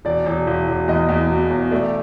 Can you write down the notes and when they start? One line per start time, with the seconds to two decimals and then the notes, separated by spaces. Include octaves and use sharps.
0.05 E1 D5
0.26 E1
0.47 E1
0.68 E1
0.88 E2 D#5
1.09 E2
1.30 B2
1.50 E1
1.72 A3 D5